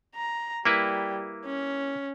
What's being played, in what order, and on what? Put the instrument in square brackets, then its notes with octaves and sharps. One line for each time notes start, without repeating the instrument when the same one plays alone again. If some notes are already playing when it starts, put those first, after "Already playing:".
[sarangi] A#5
[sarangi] G3 [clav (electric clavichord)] A#3 E4 B4
[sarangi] C#4